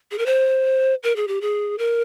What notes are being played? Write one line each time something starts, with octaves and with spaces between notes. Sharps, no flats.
G#4
A#4
C5
A#4
G#4
G4
G#4
A#4